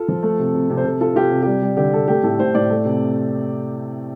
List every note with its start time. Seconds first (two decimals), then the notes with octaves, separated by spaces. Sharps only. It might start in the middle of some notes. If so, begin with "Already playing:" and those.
Already playing: F4 A4
0.08 F3
0.23 A3
0.39 C3
0.54 C3
0.70 C3
0.77 C5
0.84 C3 A4
1.01 F4 A4
1.16 F4 G4
1.31 C3
1.42 G3 G4
1.62 G3
1.77 D3 G4
1.93 G3 A4
2.08 A3 G4
2.23 A2 A4
2.39 A2 C5
2.54 A2 D5
2.70 A3
2.85 C3